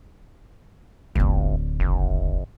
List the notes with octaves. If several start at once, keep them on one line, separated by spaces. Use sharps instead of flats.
D1 G1 D3
F#1